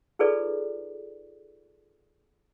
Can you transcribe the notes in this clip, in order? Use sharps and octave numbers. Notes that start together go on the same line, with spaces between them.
D#4 F4 G#4 A4 B4 D5